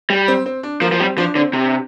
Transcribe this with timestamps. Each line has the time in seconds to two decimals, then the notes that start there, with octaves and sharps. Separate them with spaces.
0.10 G3
0.28 C4
0.46 C4
0.63 D4
0.81 F3 A#3
0.92 F3
1.00 G3 C4
1.18 F3 D4
1.35 D3 C4
1.53 C3 C4
1.63 D4